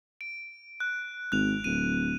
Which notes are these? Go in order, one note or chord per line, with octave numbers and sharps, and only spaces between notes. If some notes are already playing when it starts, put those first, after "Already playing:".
D7
F#6
G#1 F#6 F7
D1 D#7